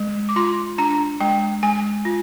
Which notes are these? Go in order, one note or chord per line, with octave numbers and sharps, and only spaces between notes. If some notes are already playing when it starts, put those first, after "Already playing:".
Already playing: G#3
D6
F4 C6
D4 A#5
G#3 G5
G#3 G#5
F4